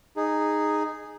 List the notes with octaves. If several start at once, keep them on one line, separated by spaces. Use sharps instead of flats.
D#4 G#4